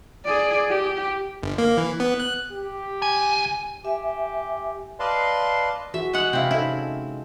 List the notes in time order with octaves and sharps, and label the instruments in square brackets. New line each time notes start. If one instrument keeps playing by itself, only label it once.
[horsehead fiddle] G#4 D5
G4
[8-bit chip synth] G1
A#3
E3
B3
F#6
[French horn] G4
[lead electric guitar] C#2 G#5
[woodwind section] G4 [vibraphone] E5 G#5
[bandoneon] B4 D5 D#5 F5 A5 C6
[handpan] E3 F#4 G#4 [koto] E5
[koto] G#3 F#5
[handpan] C3 G#3 F5 [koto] C4 E4
[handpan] C#4 D#4 A4 [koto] E4